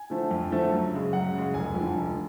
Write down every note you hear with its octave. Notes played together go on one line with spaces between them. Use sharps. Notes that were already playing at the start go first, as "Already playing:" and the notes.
Already playing: G#5
D3 F3 A3
F2
D3 F3 A3
F#2
C#3 G#3
F#2 F#5
C#3 G#3
F1 G#5
F2 D3
F1